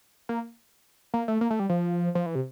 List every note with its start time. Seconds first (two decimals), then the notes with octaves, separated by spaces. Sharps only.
0.29 A#3
1.14 A#3
1.28 A3
1.41 A#3
1.50 A3
1.60 G3
1.70 F3
2.15 F3
2.26 E3
2.35 C3